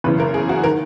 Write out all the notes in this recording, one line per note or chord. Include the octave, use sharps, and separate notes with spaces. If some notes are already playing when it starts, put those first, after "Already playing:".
F#1 E2 C#3 E3 B4
A#4
G#4
F#4
D#3 A#4